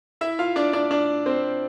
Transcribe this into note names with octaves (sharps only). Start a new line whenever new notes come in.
E4 E5
F4 F5
D4 D5
D4 D5
D4 D5
C4 C5